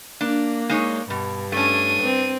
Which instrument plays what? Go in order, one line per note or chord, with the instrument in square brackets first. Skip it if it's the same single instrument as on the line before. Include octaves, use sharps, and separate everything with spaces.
[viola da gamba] A#3 [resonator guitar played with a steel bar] D4
[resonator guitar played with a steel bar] G#3 D#4 C#5
[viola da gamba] G2 [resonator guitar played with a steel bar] B2
[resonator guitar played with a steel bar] A3 C#4 [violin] D4 D#7
[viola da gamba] C4